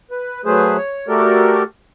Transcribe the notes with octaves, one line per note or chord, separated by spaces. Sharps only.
B4
F#3 A3 G#4 B4 C5
C#5
A3 F#4 G4 A4 A#4 D5